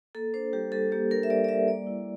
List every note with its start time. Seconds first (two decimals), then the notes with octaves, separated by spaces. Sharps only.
0.15 A#3 A4
0.34 D4 C5
0.53 G3 G4
0.72 G3 A4
0.92 A#3 G4
1.11 D4 A#4
1.23 E5
1.30 G3 D5
1.44 D5
1.49 G3 E5
1.67 A#3 D5
1.87 E4